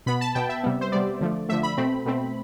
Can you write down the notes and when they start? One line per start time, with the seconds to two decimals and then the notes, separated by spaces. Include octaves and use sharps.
0.06 B2 B3 B5
0.21 A5
0.35 B2 B3 G5
0.49 E5
0.63 C3 G3 B3
0.81 C5
0.92 C3 G3 B3 D5
1.21 D3 F3 A3
1.49 D3 F3 A3 E5
1.63 B5
1.77 B2 A3 C4
2.06 B2 A3 C4